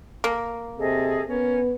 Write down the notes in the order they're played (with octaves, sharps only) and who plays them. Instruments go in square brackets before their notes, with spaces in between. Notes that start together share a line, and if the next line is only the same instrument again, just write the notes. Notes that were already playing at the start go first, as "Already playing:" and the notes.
[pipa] A#3
[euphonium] C3 [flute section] G#4 A4 D#5
[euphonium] B3 [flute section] C#4 A#4